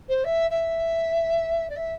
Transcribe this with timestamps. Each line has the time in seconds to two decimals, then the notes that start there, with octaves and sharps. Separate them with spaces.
0.08 C5
0.24 E5
0.50 E5
1.69 D5
1.76 E5